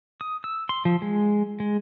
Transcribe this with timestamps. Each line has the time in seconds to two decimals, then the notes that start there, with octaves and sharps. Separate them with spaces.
0.21 D#6
0.44 E6
0.69 C6
0.85 F3
1.02 G#3
1.60 G#3